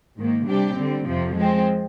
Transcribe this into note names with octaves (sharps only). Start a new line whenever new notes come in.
G#2 D#3 A#3
C3 G3 D4 G4
D3 G3 C4
F2 C3 F3
F3 G#3 C4